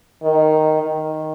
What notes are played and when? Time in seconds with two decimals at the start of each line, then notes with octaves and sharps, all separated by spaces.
0.23 D#3
0.82 D#3